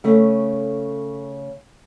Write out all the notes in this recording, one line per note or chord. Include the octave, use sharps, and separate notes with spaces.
C#3 A3